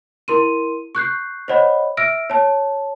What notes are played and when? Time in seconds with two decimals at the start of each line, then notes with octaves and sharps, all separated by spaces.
0.28 E4 A#4 C6 D#7
0.95 C#6 F#6 G6 C7
1.48 C5 C#5 D#5 F#5 B5
1.97 E5 E6 F6 A#6 D7
2.30 C#5 A5